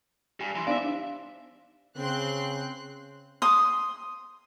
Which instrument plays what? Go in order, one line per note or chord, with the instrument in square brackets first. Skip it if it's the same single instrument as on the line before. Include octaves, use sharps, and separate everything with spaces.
[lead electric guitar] G2 [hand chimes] G4 G#5
[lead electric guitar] E3 [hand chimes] B5 C6 A#6
[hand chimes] B3 D#4 C5 [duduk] D4 [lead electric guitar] D5 E5 [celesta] F5
[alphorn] C#3 [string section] C4 C6 F#6
[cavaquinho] C6 D#6